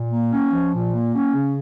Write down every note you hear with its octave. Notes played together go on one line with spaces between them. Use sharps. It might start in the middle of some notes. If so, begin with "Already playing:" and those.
Already playing: A#2
A#3
C#4
F3
A#2
A#3
C#4
C#3